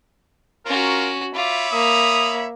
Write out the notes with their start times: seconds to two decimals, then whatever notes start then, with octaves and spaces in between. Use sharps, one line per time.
0.66 C#4 F4 F#4 A#4
1.34 F4 C#5 E5 B5 D6
1.73 A#3 D#6